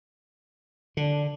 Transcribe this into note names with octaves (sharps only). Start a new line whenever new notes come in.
D3 D4